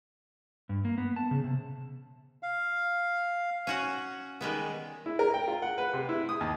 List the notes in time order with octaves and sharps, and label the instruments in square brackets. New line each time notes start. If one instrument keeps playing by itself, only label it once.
[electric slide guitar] G2
A#3
B3
A5
C#3
C3
[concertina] F5
[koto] C#4 F#4 F#5
D#3 G3 G#3 B3
[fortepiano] E4
A#4
G5
F4
F#5
B4
C3
E4
D#6
D#2